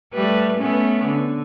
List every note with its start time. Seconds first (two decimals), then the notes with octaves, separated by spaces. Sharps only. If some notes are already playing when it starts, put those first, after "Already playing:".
0.14 G3 A3 B4
0.57 A3 B3 C#4
1.04 D3